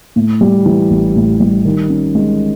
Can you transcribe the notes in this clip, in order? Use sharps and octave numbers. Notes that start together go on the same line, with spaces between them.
A2
G3
E3
A1
A2
G3
D#3
C#4
G#3